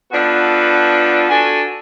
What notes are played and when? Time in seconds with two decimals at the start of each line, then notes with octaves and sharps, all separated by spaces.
0.11 F3 B3 D4 F#4 A4 B4
1.29 D4 F#4 A4 G#5